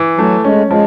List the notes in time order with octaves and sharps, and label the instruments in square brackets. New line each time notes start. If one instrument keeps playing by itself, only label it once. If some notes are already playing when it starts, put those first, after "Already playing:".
Already playing: [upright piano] E3
[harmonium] F#3 [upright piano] A3
[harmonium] G#3 [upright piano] C#4
[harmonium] G3
[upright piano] F3 [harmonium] G#3